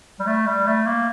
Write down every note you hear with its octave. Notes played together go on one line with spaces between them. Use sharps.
G3
A3
G3
A3
A#3